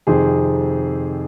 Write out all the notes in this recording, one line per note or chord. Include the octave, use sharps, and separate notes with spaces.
F2 C3 D#3 G#4 C5